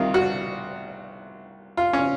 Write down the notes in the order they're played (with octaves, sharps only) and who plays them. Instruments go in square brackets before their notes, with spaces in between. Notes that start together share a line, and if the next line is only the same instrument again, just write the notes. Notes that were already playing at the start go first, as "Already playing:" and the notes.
Already playing: [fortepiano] C2 C3 D#3 F4
F#4
F4
C#4